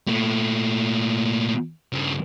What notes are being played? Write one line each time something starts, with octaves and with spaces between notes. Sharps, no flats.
A#2 A3
G2 C#3